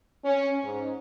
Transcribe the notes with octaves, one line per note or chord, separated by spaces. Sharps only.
C#4
G#2